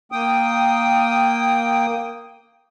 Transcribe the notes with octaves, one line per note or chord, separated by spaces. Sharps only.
A#3 G5 D#6